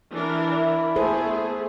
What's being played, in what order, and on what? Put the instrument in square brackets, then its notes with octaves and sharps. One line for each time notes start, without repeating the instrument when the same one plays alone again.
[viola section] E3 D4 A#4 [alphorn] E4
[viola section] A3 B3 G#4 [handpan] A4 C5